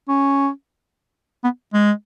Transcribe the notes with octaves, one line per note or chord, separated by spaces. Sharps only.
C#4
B3
G#3